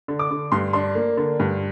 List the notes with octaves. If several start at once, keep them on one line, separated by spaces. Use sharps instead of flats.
D3
D6
D3
G2 C6
D4 C6
A#3
D3
G2